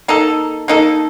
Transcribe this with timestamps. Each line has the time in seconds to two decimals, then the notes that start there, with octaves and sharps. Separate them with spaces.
0.08 A#3 D#4 A4
0.68 A#3 D#4 A4